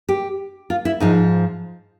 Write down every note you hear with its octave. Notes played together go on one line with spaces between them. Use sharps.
G4
F4
E4
G#2 F3 D#4